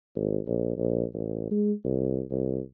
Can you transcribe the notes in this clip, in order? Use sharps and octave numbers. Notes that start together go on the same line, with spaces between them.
G#1
A#1
A#1
A1
G#3
C2
C2